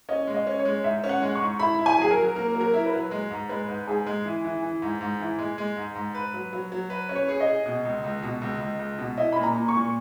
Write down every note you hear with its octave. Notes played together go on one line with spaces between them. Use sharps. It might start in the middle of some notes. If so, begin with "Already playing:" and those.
C#4 D#5
G#3
D#5
C#4
C#5
G#3
G#2 E5
C#4
F#5
G#3
C#6
G#2
E4 B5
E4
G#5
F#3 G#4
A#4
F#3
A#3 A#4
F#3
A#4
E4
B4
F#3
G#3
G#2
G#3 B4
G#2
G#2 G#4
G#3
E3
E3
E3
G#2
G#2
E3
G#3
G#3
G#2
G#2
B4
F#3
F#3
F#3
B4
C#4
C#5
G#4
D#5
G#4
B2
C#2
C#2
B2
C#2
C#2
C#2
B2
E4 D#5
A#2 B5
A#5
A#2
C#6
A#2